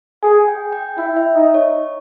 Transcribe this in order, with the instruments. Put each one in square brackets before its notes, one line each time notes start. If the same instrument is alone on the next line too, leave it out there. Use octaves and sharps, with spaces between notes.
[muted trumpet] G#4 [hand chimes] G#5
[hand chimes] G5
G5
[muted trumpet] E4 [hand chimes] G5
[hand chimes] E5
[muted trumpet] D#4 [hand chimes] D#5
[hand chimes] C#5